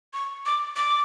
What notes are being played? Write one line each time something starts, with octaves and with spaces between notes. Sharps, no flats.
C#6
D6
D6